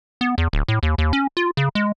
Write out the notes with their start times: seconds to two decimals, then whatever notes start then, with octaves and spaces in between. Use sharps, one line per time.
0.21 B3
0.38 E2
0.53 D1
0.68 A2
0.83 D#2
0.98 D#2
1.13 C#4
1.37 F4
1.57 C#3
1.75 G#3